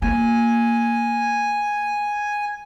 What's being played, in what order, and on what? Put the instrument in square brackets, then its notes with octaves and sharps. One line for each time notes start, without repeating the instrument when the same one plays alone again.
[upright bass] A#3 [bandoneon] G#5